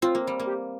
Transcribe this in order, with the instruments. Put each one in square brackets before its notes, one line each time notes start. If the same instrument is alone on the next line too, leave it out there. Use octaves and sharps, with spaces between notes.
[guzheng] C4 [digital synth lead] F4
[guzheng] A#3
G3
A#3
[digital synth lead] G4